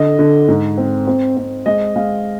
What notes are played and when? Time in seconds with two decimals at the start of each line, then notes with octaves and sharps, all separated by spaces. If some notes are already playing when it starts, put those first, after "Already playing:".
Already playing: D3 D#5
0.19 D3
0.48 G#2
0.78 C4
1.07 C4
1.37 C4
1.66 G#3 D#5
1.96 G#3 F5